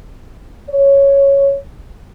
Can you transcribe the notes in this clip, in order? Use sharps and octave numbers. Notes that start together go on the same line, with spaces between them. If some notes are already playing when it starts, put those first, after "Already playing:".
C#5